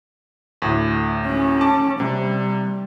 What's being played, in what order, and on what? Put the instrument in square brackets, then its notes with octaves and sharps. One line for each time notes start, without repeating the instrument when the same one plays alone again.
[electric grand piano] D2 A2
[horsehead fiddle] C#4
[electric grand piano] A5 D6
[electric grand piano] C3 [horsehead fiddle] G3